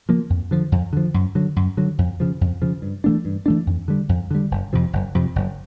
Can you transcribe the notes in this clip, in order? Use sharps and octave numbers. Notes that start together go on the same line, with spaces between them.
C#3 F3 A#3
F2
D3 F3
F2
D3 F3
F#2
D3 F#3
F#2
D3 F#3
F2
C#3 F3
F2
C#3 F3
G2
E3 A3 D4
G2
E3 A3 D4
F2
D3 G3
F2
D3 G3
F#1
F2 C3 F3
F#1
F2 C3 F3
F#1